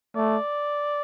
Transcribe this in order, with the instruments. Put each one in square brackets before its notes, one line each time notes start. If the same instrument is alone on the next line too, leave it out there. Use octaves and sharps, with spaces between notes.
[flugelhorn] A3 [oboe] D5